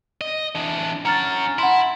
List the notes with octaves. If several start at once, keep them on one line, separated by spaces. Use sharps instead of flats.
D#5
E3 D4
C#4 F#5 A#5 F6 A6
E4 F#5 C6